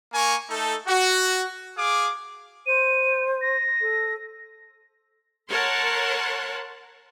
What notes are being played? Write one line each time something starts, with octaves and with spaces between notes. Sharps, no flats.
A#3 A#4 G#5 C#6
A3 D#4 A4
F#4
G#4 F5 D6
C5 D#7
A#6
A4
A#4 C#5 F#5 A5 C6